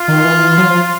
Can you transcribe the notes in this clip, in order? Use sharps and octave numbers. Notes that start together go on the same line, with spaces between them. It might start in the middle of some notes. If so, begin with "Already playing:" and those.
Already playing: F4
D#3
E3
F#3
F3